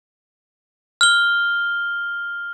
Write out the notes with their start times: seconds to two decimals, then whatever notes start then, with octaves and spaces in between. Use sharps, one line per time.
1.01 F6 G7